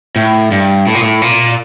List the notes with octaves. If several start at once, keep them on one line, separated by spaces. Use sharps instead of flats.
A2
G2
A2
A#2
A2
A#2